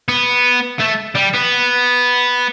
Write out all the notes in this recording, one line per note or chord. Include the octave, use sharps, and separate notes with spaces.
B3
A3
G3
B3